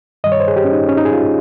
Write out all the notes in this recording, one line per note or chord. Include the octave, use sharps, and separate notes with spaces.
G2 D#3 G3 D#5
C#5
C5
G#4
G4
C#4
D#4
C#4
D#4
G#4
F4